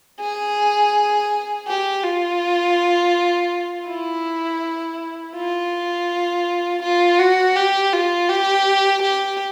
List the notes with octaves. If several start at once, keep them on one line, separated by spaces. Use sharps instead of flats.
G#4
G4
F4
E4
F4
F4
F#4
G4
F4
G4
G4